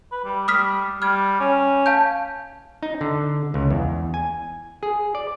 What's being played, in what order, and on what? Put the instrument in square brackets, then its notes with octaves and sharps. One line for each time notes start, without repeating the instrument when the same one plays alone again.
[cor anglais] B4
G3
[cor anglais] G3 [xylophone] D#6 F6 B6
[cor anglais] G3 [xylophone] F6 G#6
[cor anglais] C#4
[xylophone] F5 A5 G6
[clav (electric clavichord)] D#4
D3
C#2
E2
G#5
G#4
D5